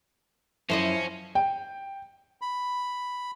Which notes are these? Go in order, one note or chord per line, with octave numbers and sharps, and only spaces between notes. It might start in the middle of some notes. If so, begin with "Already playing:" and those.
F#2 F3 C#4 E4 C5 D#5
G5
B5